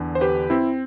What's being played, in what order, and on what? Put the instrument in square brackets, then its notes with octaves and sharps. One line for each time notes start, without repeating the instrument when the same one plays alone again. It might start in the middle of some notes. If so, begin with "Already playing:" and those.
Already playing: [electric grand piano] E2 D3
C5
G4 B4
C4 E4